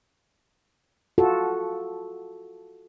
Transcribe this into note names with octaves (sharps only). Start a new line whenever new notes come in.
F4 F#4 A4